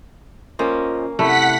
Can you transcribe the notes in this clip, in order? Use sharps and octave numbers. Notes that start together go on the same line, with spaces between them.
A#3 C#4 F4 C5 D#5
C3 A3 E4 F#5 B5 B6